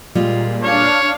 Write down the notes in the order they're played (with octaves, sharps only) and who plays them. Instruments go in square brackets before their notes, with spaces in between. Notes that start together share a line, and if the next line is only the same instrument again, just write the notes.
[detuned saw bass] A#2 [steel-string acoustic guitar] G3 G#3 F4
[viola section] D4 F5 [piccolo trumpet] C#5